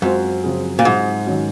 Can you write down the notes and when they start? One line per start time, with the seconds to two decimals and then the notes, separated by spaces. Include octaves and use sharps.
0.02 F#2 G#3 C4 F4 C5
0.44 C#3 F3 C4 F4 G#4
0.79 A#2
0.85 G#2 F#3 C4 F4 G#4 C5
1.27 D#3 F#3 C#4 F#4